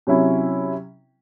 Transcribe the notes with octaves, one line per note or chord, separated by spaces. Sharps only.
C3 F#3 C#4 E4